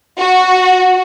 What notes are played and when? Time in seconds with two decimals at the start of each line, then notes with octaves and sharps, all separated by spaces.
0.20 F#4